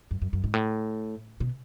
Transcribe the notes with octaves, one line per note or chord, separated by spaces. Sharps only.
F#2
F#2
F#2
G#2
A2
B2